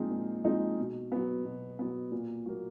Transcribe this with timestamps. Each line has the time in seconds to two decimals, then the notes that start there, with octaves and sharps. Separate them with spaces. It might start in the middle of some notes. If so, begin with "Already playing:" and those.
Already playing: A#2 F3 G#3 C4 D#4
0.11 A#2
0.44 F3 G#3 C4 D#4
0.78 B2
1.12 F#3 B3
1.45 B2
1.79 F#3 B3
2.12 A#2
2.46 F#3 A#3